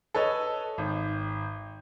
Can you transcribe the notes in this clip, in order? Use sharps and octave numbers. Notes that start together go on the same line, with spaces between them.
A4 B4 C#5 D#5
G#1